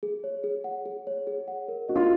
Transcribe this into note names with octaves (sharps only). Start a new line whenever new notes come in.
G#4
C#5
G#4
F#5
G#4
C#5
G#4
F#5
A#4
F#4 D#5
F4